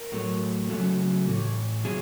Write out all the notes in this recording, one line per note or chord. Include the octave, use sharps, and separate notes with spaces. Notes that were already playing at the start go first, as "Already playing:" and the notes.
Already playing: A#4
A2 F#3 A3
C#3 F#3 A3
A2 E3 A3
C#3 F#3 A3 G#4